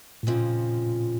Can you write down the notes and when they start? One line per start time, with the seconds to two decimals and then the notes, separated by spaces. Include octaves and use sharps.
0.23 A2
0.27 F2 A#2 C#3 F3